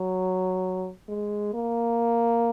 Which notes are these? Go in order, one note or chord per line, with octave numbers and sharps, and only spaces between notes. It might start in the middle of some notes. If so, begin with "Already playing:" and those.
Already playing: F#3
G#3
A#3